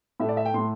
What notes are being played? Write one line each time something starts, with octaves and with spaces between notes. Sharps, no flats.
A2 A3 E5
D5
E5
G5
A2 A3 C6